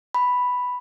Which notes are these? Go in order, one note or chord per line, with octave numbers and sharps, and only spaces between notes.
B5